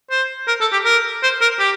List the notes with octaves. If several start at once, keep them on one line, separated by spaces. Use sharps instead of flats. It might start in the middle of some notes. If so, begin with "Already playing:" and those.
C5
A#4
A4
G4
A#4
C5
A#4
G4